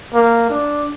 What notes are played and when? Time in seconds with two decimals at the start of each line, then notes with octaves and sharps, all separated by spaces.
0.14 A#3
0.50 D4